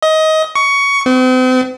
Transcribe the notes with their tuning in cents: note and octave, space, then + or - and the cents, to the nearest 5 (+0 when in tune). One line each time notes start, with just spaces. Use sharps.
D#5 +20
C#6 +15
C4 -40